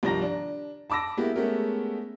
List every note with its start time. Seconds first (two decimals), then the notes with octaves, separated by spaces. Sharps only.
0.03 C2 G2 D#3 F3 A#5 A#6
0.22 D4
0.90 A5 B5 D6 E6 A#6
1.17 G#3 A#3 B3 E4 G4
1.36 G#3 A3 B3 C#4 G4 A#4